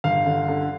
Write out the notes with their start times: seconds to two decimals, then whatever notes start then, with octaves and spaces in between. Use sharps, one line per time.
0.04 G1 F5
0.26 D3
0.48 D3